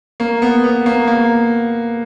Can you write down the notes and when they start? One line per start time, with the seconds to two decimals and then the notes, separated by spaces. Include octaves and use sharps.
0.20 A#3
0.42 B3
0.64 B3
0.86 A#3
1.07 A#3